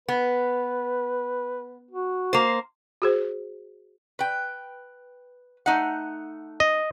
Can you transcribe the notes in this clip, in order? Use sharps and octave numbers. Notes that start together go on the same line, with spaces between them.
B3 B4
F#4
A#3 C5
F#4 G#4 C5
B4 G5
A3 D#4 F#5
D#5